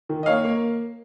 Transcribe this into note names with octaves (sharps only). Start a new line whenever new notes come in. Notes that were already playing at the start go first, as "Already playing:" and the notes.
D#3
D#5
A#3 C#5 F5
A#3